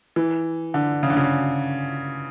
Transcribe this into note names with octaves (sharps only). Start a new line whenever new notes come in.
E3
D3
C#3
D3
C#3